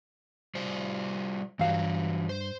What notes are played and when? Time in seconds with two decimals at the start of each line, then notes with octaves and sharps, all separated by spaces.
0.55 G3 F4 C5
1.59 G2 E3 F#3 F5
2.29 C5